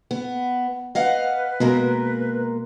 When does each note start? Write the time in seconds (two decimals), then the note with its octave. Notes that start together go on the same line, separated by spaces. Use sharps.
0.11 B3
0.95 B4 D#5 F5 F#5
1.60 B2 G#3 A#3 A#4